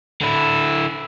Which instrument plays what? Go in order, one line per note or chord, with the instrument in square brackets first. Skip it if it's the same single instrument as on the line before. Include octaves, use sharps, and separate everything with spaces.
[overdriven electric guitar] D3 E4